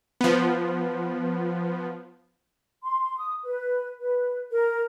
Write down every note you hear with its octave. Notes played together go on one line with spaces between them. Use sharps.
F3 B3
C6
D#6
B4
B4
A#4